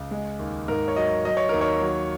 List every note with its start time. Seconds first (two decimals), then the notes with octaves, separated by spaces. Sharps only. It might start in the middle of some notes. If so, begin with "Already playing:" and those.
Already playing: C#2
0.11 G#3
0.39 D#2
0.68 G#2 A#4
0.88 C#5
0.96 F#3 D#5
1.25 F#3 D#5
1.37 C#5
1.49 D#2 A#4
1.61 C#5
1.81 F#3